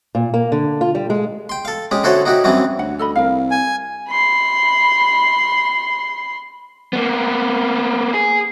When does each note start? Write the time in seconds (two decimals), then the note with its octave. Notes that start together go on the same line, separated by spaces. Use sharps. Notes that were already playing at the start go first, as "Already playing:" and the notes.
0.15 A#2
0.34 A#3
0.52 D3
0.81 F4
0.95 G3
1.10 G#3
1.49 G5 C6
1.65 A4 F5
1.91 G#3 C#4 G4
2.03 D3 E4 F#4 A4 C5 C#5
2.25 D#4 E4 F#4 G4
2.44 F#2 E3 F#3 G3 C4 C#4
2.79 D2 F#5
2.99 A4 D#5 B5
3.15 C2 A#4 F5
3.51 G#5
4.09 B5 C6
6.93 A#3 B3
8.14 G#4